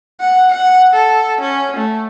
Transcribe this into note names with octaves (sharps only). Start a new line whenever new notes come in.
F#5
F#5
A4
C#4
A3